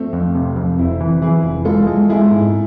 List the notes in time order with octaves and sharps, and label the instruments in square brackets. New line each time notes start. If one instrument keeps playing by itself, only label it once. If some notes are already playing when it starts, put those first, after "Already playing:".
Already playing: [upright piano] F3 A3 C4
[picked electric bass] F2
C3
F2
[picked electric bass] F1 [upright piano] C4 E4
[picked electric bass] E3
[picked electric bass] E3 [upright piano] E4 G#4
[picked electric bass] F1
[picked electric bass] G#3 [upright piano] F4 A4
[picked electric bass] G#3
[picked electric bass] G#3 [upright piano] E4 G#4
[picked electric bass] G#2